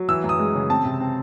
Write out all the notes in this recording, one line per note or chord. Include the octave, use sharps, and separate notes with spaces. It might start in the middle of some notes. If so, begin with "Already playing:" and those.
Already playing: F#3
E3 E6
F#2
D#6
G#3
C#3
C4 A5
C3
C4